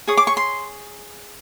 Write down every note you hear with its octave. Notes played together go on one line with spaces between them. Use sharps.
G#4 C#5 D#6
D6
C#6
C6